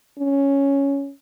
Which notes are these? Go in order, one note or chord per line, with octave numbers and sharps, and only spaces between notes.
C#4